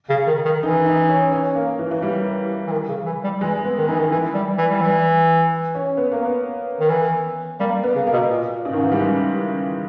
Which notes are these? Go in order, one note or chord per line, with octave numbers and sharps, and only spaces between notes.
C#3
D#3
D#3
E3 D#4
D#4
C#4
C#4
A#3
E3
E3
G3
E3
D#3
C#3
E3
G3
E3 G#3
B3
D#3
E3 D#4
D#3
E3 E4
G3
E3
G3
E3
C#4
B3
A#3
B3
D#3
E3
G3 A#3
B3
C#3
A#3
B2
A#2
G#2 C#3
D#3
E3
G3
G#3